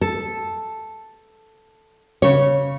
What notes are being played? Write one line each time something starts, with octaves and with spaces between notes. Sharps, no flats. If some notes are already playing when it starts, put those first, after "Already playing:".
A4
C#3 C#5